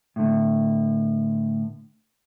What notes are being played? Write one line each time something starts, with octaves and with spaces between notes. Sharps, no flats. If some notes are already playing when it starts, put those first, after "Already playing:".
A2 D3